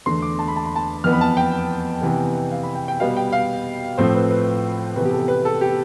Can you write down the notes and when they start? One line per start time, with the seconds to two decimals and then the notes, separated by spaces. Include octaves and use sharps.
0.06 E2 D3 A3 C6
0.22 D6
0.39 A5
0.48 B5
0.56 A5
0.66 B5
0.76 A5
1.04 F2 E3 B3 F6
1.13 B5
1.21 A5
1.37 G5
2.01 C3 E3 B3
2.51 F5
2.63 B5
2.75 G5
2.88 G5
3.00 B2 G3 B3 F5
3.17 G5
3.32 F5
3.98 A2 F3 A3 C4 C5
4.15 B4
4.31 B4
4.96 C3 E3 B3 B4
5.05 G4
5.12 A4
5.28 B4
5.45 A4
5.61 G4